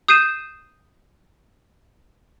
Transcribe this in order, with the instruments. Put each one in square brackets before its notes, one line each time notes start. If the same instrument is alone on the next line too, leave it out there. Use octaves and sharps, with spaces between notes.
[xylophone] D#6 G6 C7 D#7 E7